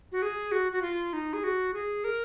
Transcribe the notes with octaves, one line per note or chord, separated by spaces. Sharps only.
F#4
G#4
F#4
F#4
F4
D#4
G#4
F#4
G#4
A#4